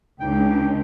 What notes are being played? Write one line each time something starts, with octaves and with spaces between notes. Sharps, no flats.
C#2 D4 D#4 G5